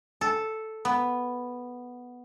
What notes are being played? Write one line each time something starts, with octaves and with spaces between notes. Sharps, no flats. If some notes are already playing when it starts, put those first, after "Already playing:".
A4
B3